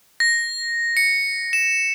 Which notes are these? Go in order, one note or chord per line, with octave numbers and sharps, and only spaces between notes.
A#6
C#7
E7